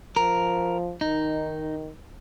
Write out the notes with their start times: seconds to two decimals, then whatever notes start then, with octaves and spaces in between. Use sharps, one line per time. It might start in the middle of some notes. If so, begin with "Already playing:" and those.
0.16 F3 A#4
1.01 D#3 D#4